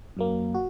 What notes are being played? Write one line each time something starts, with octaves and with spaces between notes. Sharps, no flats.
F#2 F#3 A#3
F#4